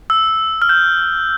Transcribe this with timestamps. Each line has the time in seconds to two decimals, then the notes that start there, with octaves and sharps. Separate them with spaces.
0.10 E6
0.62 F6
0.69 G6